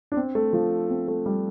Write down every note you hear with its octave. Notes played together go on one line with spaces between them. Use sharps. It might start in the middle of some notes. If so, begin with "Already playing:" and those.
D4
C4
A3
F3
C4
A3
G3